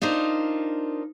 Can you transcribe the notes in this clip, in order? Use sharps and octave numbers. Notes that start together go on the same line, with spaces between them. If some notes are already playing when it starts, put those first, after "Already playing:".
D4 D#4 F4 A#4 C5